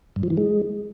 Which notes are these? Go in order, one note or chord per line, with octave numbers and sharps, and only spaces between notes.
G2
F3
E3
G#3